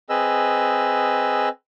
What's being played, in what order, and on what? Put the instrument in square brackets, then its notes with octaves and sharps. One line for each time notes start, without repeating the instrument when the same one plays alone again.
[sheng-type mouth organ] C4 G#4 B4 D#5 E6